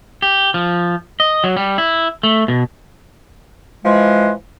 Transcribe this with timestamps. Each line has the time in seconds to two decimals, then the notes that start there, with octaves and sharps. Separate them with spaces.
0.22 G4
0.54 F3
1.20 D#5
1.44 F#3
1.57 G3
1.78 E4
2.23 A3
2.48 B2
3.85 E3 F3 G#3